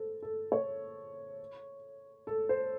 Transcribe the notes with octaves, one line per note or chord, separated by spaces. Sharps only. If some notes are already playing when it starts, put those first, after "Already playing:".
Already playing: A4 C5
A4
C#5
A4
C5